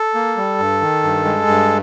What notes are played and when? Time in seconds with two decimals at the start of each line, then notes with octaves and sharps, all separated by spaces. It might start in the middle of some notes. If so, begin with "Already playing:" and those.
Already playing: A4
0.15 A#3
0.37 G3
0.59 G2
0.81 D#3
1.03 G2
1.25 G#3
1.47 G2